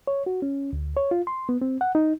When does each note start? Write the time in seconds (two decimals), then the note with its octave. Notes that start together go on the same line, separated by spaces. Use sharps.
0.07 C#5
0.26 F#4
0.42 C#4
0.73 D2
0.97 C#5
1.11 F4
1.27 C6
1.49 B3
1.62 C4
1.81 F#5
1.95 D#4